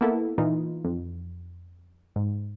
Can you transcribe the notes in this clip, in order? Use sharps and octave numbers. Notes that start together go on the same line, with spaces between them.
A#3 B3 E4 A4
A#2 E3 D#4 F4
F2
G#2